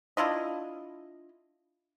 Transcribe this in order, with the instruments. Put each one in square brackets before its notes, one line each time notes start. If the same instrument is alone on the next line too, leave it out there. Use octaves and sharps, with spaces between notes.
[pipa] D4 E4 F4 D#5